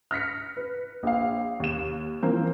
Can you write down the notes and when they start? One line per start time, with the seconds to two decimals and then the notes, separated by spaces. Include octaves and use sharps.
0.11 F6 A#6 B6 C#7
0.57 B4
1.03 A#1 F5
1.60 D#2 E7
2.22 E3 F3 A#3 C4